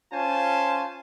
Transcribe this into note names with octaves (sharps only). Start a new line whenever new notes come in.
C#4 F4 C5 G#5 A5